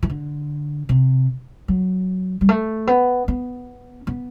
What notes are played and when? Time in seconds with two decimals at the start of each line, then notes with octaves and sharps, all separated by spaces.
0.03 E3
0.10 D3
0.89 C3
1.68 F#3
2.41 G3
2.49 A3
2.87 B3
3.28 B3
4.07 B3